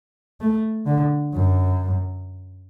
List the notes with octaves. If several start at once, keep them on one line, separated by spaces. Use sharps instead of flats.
A3
D3
F#2